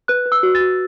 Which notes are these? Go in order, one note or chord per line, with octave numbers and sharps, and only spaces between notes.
B4 F#6
B4
E6
F#4
A6
F#4